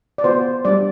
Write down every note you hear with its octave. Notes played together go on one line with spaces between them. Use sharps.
D5
B3 F#4 C5
G3 D4 F#4 D5